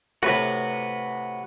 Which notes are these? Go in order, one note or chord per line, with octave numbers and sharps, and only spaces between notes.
A2 C3 F#4 B4